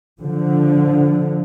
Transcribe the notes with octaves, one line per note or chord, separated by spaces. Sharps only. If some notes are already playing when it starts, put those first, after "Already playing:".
D3 F3